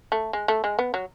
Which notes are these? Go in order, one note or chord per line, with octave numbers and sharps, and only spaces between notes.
A3
G#3
A3
G#3
B3
F#3